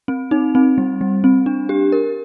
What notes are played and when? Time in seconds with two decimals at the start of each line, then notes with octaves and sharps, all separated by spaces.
0.08 C4
0.31 D#4
0.55 C4
0.78 G3
1.01 G3
1.24 C4
1.46 D4
1.69 G4
1.92 A#4